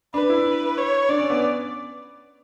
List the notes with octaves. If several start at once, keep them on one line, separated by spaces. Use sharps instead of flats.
D4 B4
E4
C#5
D4 D5
C#4
B3